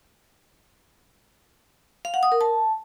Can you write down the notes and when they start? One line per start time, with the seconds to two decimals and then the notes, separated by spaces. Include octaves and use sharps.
2.05 F5
2.14 F#5
2.23 D#6
2.32 A#4
2.41 A5